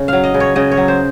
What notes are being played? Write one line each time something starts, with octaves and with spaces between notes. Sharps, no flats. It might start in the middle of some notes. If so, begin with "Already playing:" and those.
Already playing: C#3 C#5
F#3 F5
D#5
C#3
C#5
C#3 D#5
C#5
F#3
C5